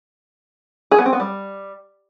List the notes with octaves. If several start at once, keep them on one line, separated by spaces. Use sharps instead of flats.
G#4
B3
C4
B3
G3